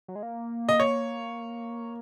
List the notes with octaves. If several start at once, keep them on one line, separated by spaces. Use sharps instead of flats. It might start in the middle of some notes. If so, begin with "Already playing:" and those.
F#3
G#3
A#3
D#5
C#5